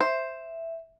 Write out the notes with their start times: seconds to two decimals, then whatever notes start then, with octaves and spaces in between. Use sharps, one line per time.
0.01 C5 E5